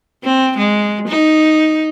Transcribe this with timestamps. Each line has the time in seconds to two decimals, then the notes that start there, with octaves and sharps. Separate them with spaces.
0.24 C4
0.57 G#3
1.08 D#4